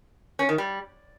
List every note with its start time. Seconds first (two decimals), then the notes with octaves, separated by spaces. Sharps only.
0.39 C#4
0.49 D#3
0.58 G3